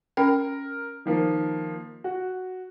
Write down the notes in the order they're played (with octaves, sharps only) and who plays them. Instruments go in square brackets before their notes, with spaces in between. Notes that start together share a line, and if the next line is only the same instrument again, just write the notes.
[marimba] C#4 G5 [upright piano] A#4
[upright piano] D#3 F3 A#3
F#4